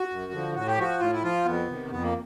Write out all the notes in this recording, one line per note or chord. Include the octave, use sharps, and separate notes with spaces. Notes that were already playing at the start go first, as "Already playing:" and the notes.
Already playing: F#4
F#2
D3 F3
A2 F#4
G4
F3 F#4
A2 F4
E4
F3 F4
F2 B3
C3 D#3
F2 B3
A#3